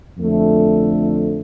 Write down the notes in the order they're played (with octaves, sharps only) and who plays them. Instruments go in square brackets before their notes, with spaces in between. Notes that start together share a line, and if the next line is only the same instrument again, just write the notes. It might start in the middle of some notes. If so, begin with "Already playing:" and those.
[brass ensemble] F2 D3 A3